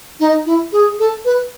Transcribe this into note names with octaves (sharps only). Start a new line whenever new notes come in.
D#4
E4
G#4
A4
B4